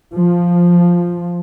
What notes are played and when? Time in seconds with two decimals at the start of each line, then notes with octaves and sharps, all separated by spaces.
0.14 F3